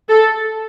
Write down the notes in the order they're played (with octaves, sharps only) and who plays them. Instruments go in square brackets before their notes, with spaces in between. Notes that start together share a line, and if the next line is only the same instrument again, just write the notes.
[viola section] A4